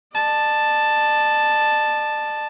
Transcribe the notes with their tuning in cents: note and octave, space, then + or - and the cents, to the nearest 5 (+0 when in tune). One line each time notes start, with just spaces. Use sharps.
D5 +45 A5 +0